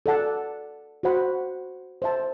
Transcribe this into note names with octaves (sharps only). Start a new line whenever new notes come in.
A4 D5 F#5 A5
F#4 C5 F#5 B5
C5 E5 A5